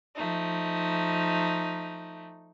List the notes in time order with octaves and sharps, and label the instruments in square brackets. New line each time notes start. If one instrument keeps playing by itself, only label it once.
[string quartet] F3 A3 D#4